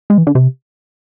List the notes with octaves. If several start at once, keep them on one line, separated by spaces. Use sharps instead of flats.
G#3
E3
D3
C3